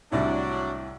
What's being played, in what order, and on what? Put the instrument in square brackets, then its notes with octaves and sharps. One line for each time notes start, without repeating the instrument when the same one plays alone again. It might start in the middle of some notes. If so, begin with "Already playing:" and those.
[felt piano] C2 A2 [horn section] F#3 D4